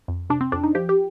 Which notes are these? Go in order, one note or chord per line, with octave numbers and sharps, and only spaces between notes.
F2
C3 D4
C4
F2 D4
D#4
F3 G4
G4